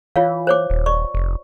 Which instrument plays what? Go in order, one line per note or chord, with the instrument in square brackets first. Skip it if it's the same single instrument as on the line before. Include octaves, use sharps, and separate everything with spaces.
[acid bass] E3 [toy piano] F4 C#5 F5
[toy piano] C5 C#5 D6
[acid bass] D#1
[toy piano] D5 C#6
[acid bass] F1